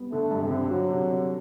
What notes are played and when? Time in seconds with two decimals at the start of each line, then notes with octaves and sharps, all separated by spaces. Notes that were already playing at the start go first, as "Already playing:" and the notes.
Already playing: G3 B3
0.12 D3 A3
0.31 G2
0.42 C3
0.51 D3
0.71 F#3 F#4
0.90 C3
1.10 C3